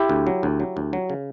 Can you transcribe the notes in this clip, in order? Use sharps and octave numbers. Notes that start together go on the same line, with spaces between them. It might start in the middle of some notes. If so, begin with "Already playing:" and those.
Already playing: E4 G4
D2
F#3
D2
F#3
D2
F#3
C#3